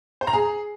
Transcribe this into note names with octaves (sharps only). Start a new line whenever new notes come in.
C5
A#5
G#4